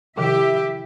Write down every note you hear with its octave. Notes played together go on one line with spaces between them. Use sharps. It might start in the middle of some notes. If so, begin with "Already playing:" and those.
C3 D#3 F3 E4 G4 E5